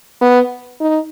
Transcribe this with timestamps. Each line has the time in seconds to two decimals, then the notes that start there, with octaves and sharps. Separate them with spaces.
0.21 B3
0.81 D#4